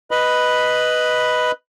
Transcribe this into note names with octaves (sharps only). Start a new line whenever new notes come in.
B4 D#5 B5